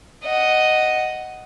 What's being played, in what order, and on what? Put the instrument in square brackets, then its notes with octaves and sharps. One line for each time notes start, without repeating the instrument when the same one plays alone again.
[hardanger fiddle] D#5 F#5